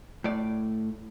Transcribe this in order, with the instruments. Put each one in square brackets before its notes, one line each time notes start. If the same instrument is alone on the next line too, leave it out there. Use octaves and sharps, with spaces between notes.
[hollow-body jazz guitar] A2 D5